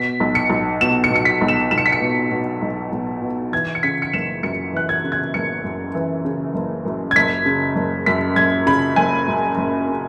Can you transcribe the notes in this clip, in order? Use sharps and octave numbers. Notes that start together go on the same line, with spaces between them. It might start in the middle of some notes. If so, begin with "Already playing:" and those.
Already playing: B2 B6
B1
C#7
B1
B2 E7
C#7
B2
C#7
B6
B1
E7
B1 E7
C#7
B6
C#7
B2
B2
B1
B1
B2
E3 G#6
C#7
C#3 B6
C#7
F#1 E7
F#2 C#7
E3 F#6
G#6
C#3
G#6
F#1 C#7
F#2
E3
C#3
F#1
F#2
G#6
F#1 B6
C#3
F#1
F#2 B6
F#1 G#6
C#3 B5
F#1 G#5
F#2
F#1
C#3